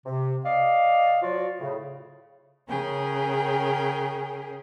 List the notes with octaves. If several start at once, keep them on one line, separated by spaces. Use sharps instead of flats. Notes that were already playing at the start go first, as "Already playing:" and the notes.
C3
D5 D#5 F5
F3 F#3 F4 F#4 D5
A2 C#3
C#3 C#4 G#4 A#4 G5 G#5